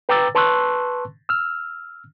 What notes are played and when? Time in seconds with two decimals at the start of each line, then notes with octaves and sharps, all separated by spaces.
0.09 B4 G5 A#5 D6 E6 A6
0.35 B4 A5 C6 C#6 E6 F#6
1.29 E6 F6